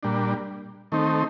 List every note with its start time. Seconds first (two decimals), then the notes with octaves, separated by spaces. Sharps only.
0.03 A#2 G3 D4
0.92 D#3 A3 C4 D#4